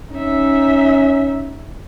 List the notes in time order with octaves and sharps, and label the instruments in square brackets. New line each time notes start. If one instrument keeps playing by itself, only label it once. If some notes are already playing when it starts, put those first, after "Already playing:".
[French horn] C#4 [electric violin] D#4 E5